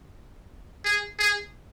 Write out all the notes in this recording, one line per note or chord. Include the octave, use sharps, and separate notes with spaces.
G#4
G#4